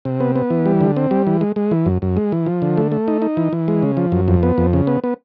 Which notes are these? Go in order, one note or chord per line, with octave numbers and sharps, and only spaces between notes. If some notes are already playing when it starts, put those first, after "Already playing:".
C3
B3
B3
E3
G3
D3
C4
G3
E3
G#3
G#3
E3
F#2
F#2
G#3
E3
F3
D3
A3
A3
D#4
D#4
E3
E3
G#3
C#3
F3
F#2
F2
B3
F2
C#3
B3
B3